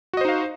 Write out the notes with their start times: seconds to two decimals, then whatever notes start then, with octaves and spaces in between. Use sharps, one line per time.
0.13 F#4
0.17 D#5
0.21 C5
0.25 D#4
0.29 F5